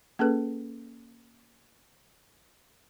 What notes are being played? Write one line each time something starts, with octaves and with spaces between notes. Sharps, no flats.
A#3 C#4 G#4 A4 B4